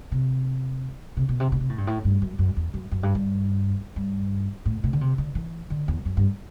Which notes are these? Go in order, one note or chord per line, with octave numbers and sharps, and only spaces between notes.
C3
C3
B2
C3
B2
C3
A2
G2
A2
G2
F#2
F#2
E2
F#2
F#2
G2
G2
G2
A2
B2
D3
C3
D3
E3
D3
E2
F#2
G2